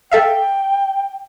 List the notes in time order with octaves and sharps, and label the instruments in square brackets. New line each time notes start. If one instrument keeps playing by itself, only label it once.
[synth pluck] A4 E5 F5 [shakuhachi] G5